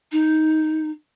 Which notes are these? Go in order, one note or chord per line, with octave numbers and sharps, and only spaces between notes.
D#4